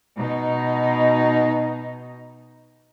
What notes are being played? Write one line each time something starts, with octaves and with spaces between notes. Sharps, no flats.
B2 D#4